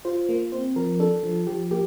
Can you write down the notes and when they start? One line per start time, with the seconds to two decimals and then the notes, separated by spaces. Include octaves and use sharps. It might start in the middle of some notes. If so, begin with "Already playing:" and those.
0.05 F4 C5
0.29 A#3
0.52 C4 C5
0.76 F3 A#4
1.00 D4 A4
1.23 F3
1.47 F3 G4
1.71 A#3 G4